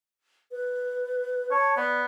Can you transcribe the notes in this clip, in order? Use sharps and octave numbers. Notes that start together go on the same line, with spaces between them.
B4
C#5 A5
B3 D5